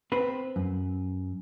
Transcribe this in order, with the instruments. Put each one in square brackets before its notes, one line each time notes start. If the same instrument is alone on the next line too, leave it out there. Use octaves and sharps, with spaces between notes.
[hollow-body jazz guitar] C4 B4
F#2